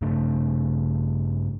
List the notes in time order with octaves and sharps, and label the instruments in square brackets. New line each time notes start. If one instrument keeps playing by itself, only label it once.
[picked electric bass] G2 C#3 A3 D4